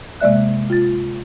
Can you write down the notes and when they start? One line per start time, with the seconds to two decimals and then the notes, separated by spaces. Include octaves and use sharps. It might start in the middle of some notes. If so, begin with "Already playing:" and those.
0.21 C3 G#3 A#3 D5 E5 F#6
0.70 F4 A6